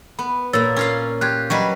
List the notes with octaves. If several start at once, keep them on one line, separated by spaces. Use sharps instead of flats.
B3 B5
A#2 A#3 C#5 E6 A6
C#4 F4 F5
F4 G4 F#6 G#6
F#3 G3 B4 D#5 C#6